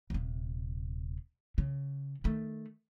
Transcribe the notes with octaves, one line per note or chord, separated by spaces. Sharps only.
D#1 C3
C#3
D#3 A3